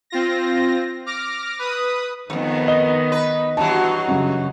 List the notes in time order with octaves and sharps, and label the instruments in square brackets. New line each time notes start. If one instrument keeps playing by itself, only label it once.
[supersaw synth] C4 F4 A#6
D6 F6 A#6
B4 D#6
[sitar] F2 G#2 [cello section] D#3 B3 D#4
[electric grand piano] D#5 [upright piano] G7
[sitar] B4
[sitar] G2 E3 F#3 [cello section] F#4 [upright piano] A5
[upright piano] F#2 C#3